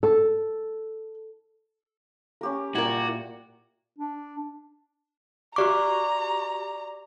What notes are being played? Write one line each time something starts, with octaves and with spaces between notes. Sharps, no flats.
A4
C#4 G4 A#4
A#2 E4 F#4 A#4 D5
D4
F#4 G4 D5 A#5 C#6 D6